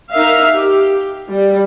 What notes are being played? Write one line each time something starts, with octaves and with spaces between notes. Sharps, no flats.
D#4 A#4 E5 F5
G4
G3